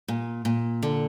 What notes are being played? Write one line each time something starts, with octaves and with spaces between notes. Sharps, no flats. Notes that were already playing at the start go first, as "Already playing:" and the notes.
A#2
A#2
D3